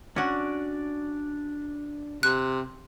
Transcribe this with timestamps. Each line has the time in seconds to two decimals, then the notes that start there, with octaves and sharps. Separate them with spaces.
0.16 C#4 D4 F#4 D5
2.23 C3 F#6